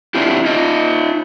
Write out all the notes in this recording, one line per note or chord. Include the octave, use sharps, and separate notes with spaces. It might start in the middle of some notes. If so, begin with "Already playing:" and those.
C4 D4 E4 F4 G4
D#4 F4 D#5